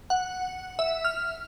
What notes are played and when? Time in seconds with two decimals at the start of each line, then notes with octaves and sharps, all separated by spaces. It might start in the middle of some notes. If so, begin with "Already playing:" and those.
0.10 F#5
0.79 E5
1.05 F6